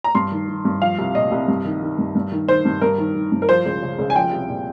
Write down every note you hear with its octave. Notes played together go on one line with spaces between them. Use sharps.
A#5
G2 C6
D#3
D#3
G2
F3 F5
C2
A#2 D#5
C2
G2
D#3
D#3
G2
G2
D#3
D#3 C5
G2
G2 A#4
D#3
D#3
G2
A#4
F3 C5
C#2
C#3
C#2
G#5
F3 G5
C2
A#2